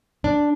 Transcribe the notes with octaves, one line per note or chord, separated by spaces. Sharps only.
D4